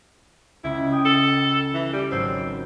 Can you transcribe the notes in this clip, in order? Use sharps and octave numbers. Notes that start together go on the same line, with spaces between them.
C#2 E4
G5 D#6
A4
E3
G3
G#1 F#3 C4 A4